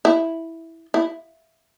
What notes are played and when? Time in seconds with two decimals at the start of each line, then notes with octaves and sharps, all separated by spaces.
0.05 E4
0.94 E4